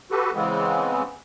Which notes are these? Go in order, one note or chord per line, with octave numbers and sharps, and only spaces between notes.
F#4 G4 A4 B4
C#3 E3 G#3 B3 C4